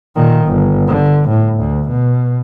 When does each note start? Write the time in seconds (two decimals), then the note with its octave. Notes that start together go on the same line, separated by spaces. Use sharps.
0.16 A#2 D#3
0.47 G1
0.88 D3
1.29 A2
1.60 D2
1.90 B2